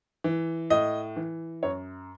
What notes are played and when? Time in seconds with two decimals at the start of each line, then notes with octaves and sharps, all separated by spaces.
0.24 E3
0.70 A2 D#5
1.16 E3
1.63 F#2 C#5